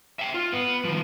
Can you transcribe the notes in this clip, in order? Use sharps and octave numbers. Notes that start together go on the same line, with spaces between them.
E5 G5
F4
B3
D#3 F3